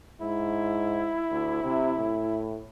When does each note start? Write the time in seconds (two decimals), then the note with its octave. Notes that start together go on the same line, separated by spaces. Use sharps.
0.22 G#2 E4
1.30 D2
1.63 C3
1.98 A2